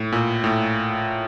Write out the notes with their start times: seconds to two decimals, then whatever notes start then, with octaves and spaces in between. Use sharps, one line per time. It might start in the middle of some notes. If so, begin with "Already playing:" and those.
Already playing: A2
0.12 A#2
0.44 A2